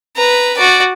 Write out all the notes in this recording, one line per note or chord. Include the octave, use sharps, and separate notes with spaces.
B4 A#5
F#4 D5